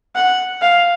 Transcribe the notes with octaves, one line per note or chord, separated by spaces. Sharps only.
F#5
F5